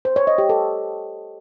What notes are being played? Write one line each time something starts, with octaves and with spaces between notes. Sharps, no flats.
C5
C#5
D#5
G4
A4